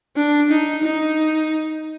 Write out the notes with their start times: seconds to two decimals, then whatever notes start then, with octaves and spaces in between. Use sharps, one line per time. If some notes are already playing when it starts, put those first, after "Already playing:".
0.17 D4
0.50 D#4
0.83 D#4